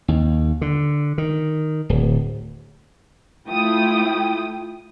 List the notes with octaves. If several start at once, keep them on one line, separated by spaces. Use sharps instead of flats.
D#2
D3
D#3
D1
A3 E4 F4 G5 D#6